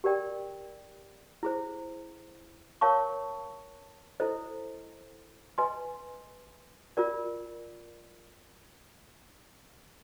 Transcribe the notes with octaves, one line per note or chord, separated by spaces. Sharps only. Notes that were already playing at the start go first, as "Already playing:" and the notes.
G4 A#4 D5 G5
E4 G#4 C5
A#4 C#5 F5 A5 C#6
E4 A4 C5 D#5
B4 D#5 G#5 C6
F4 A#4 D5